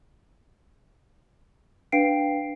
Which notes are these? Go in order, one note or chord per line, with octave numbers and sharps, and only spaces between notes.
D4 B4 F5 G5 C7 D7